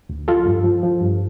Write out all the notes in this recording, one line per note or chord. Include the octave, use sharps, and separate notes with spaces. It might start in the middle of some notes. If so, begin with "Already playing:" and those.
D2
F3 F4 A4
G2
F3
F3
G2